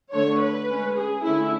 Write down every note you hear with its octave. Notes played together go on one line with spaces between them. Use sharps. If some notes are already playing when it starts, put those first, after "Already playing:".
D3 A3 D4 C#5
B4
G#3 C#4
G#4
D3 A3 C#4 E4